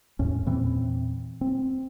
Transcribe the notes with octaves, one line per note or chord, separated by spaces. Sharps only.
E2 A2 C#4
E2 A#2 E3 C4
C4